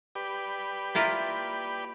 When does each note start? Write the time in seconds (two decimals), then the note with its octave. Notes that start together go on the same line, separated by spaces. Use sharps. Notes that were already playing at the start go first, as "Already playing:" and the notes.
0.15 G4 B4 D5
0.95 A#3 E4 F4